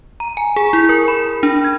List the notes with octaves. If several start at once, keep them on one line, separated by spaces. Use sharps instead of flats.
A#5
G#5
G#4
E4
A#4
B5
D4
G#6